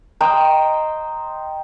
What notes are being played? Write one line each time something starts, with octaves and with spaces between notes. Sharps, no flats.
C5 D#5 G5 A#5